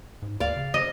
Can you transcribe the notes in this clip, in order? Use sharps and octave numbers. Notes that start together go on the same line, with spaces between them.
G#2
D2 D5 F5
C#3
D#5